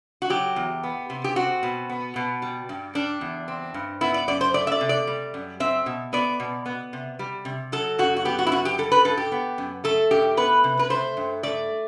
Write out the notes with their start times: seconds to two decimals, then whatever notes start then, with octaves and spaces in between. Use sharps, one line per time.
0.22 F#4
0.30 F#3 G4
0.56 E2
0.83 B3
1.10 C3
1.24 G4
1.36 C4 F#4
1.63 B2
1.89 B3
2.16 B2
2.42 G3
2.69 G2
2.95 G3 D4
3.21 E2
3.48 C4
3.74 G2
4.01 B3 E4
4.14 D5
4.28 F#2 D5
4.41 C5
4.54 A3 D5
4.67 E5
4.72 D5
4.81 C3
4.89 D5
5.07 G3
5.34 F#2
5.60 C4 E5
5.86 B2
6.13 B3 D5
6.40 B2
6.66 B3
6.93 C3
7.19 G3
7.45 C3
7.72 F#3 A4
7.99 F#2 F#4
8.16 F#4
8.25 B3 G4
8.39 F#4
8.47 E4
8.51 F#2 F#4
8.65 G4
8.78 G3 A4
8.92 B4
9.05 G2 A4
9.17 G4
9.32 B3
9.58 F#2
9.84 A3 A4
10.11 G2 G4
10.37 B3 B4
10.64 C3
10.79 B4
10.90 A3 C5
11.17 G2
11.43 A3 D5